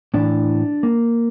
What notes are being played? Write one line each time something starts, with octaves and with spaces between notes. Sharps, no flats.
A2 E3 D4
A#3